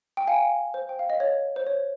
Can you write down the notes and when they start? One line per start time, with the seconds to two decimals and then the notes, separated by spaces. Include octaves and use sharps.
0.17 G5
0.27 F5 G#5
0.74 C5
0.89 G5
0.99 F5
1.10 D#5
1.20 C#5
1.56 C5
1.67 C#5